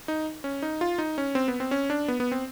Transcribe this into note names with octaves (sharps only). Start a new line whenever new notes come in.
D#4
C#4
D#4
F4
D#4
C#4
C4
B3
C4
C#4
D4
B3
B3
C4